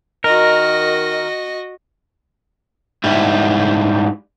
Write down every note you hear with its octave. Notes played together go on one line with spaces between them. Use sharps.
D#3 F#4 A#4 D#5
G#2 G3 E4